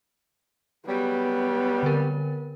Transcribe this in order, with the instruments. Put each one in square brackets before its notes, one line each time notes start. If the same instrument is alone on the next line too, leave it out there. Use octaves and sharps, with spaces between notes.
[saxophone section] C#3 F#3 G3 [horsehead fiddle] B3
[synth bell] D3 A#4